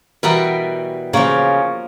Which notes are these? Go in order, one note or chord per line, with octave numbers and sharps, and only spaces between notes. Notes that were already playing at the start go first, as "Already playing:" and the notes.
B2 E3 G3 F#4 A#4 B4
C#3 F3 A#3